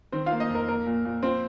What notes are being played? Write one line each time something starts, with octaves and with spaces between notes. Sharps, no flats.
D#3 C4 C5
F4 F5
A#3
D#4 D#5
F2
A#4
A#3 A#4
A#2
A#2
F3 C4 C5